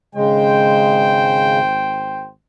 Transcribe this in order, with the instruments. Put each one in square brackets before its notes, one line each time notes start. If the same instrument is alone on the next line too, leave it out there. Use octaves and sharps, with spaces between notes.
[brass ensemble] G#1 C5 G5 [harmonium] C#3 G#3